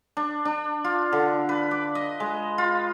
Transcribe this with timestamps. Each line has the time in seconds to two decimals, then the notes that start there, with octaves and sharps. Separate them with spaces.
0.17 D4
0.45 D4
0.84 F4
1.12 D3
1.49 B4
1.71 D6
1.95 D#5
2.20 G#3
2.58 F4